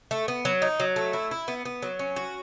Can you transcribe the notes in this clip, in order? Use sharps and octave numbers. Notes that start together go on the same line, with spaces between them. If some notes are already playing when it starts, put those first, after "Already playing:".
A3
B3
F#3
D#4
F#3
A3
E4
E4
B3
B3
F#3
C#4
F#4